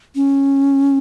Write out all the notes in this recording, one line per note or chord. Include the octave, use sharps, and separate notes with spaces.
C#4